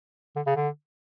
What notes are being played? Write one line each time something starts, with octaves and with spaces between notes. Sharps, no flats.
D3
C#3
D3